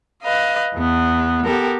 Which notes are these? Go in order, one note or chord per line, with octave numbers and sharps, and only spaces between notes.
B4 D#5 F5
E2 B3
B3 G4 A4 A#4